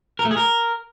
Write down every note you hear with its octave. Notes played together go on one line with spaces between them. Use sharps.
A#4
A3
G#4
A#4